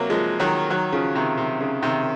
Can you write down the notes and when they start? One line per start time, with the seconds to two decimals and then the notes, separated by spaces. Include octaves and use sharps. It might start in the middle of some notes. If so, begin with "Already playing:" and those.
Already playing: C3 F#3 A#3
0.10 F3 G#3
0.40 D#3 F#3
0.70 D#3 F#3
0.92 C#3 F3
1.15 C3 D#3
1.38 C3
1.60 C#3
1.82 C3 D#3